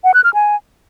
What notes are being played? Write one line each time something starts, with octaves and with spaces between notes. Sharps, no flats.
F#5
F#6
F6
G#5